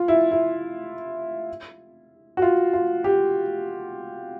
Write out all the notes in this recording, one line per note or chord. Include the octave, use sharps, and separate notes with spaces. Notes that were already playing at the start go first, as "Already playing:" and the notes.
Already playing: F4
E4
E4
F#4
F4
F4
G4